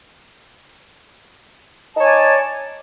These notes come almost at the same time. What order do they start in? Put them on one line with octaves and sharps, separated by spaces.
D#4 A5 C#5 G#5 D5